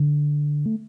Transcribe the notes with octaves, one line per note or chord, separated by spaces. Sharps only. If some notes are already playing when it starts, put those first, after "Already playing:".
Already playing: D3
A3